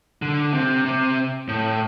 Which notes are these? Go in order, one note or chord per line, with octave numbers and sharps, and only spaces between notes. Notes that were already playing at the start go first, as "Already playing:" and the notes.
D3
C3
C3
A2